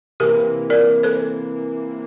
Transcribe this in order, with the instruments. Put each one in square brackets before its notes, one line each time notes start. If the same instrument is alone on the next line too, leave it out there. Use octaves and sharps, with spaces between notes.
[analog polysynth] C3 E3 A#3 [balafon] G4 A#4
[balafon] A#4 D5
A4 C5